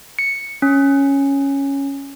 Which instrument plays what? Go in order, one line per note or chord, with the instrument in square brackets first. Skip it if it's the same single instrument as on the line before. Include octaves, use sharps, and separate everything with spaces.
[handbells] C#7
C#4